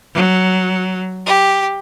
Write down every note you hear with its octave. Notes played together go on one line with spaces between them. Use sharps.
F#3
G4